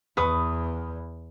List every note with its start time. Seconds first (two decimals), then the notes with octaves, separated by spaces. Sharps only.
0.17 E2 B4 C#6 D#6